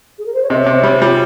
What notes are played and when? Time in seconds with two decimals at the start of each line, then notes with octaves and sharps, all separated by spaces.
0.19 G#4
0.26 A#4
0.34 C5
0.43 C#5
0.50 C3 D#5
0.61 C#5
0.66 C3
0.72 C5
0.83 G3 C#5
1.01 G3 F4